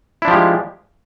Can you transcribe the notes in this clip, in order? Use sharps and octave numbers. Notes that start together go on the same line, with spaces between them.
F3 G#3 D4 E4 G4